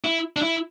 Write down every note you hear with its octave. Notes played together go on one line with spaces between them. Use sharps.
E4
D4
E4